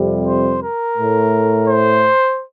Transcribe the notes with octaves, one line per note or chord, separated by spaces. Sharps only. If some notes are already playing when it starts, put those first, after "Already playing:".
Already playing: F2 C3 G3
C5
A#4
A2 A3
C5